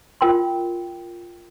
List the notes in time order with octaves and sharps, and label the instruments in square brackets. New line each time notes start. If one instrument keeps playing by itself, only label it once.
[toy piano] F4 A#4 G5 C6